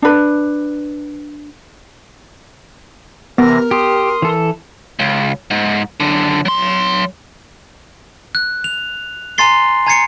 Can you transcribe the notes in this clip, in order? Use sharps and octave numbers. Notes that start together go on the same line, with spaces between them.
D4 B4
C3 E3 B3 A#4 A#6
G4 C6 D#6
E3 A4
C#2
G#2
F#2 D3
F#3 C6
F#6
F7
G#5 A#5 C6 A6 C7 G7
G#5 A#5 G#6 A6 C7 C#7